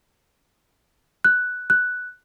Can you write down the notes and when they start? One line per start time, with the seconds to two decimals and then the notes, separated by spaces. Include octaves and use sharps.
1.24 F#6
1.70 F#6